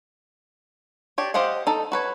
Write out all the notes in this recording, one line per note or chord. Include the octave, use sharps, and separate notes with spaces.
D4 G4 C#5
G4 C5 D#5 F5 F#5
D#4 A4
F#4 B4 C#5